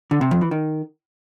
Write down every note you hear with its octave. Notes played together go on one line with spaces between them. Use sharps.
D3
C3
F2
E3
D#3